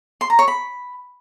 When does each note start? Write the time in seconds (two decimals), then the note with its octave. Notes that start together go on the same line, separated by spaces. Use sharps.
0.21 C6
0.30 A#5
0.39 C#5
0.48 B5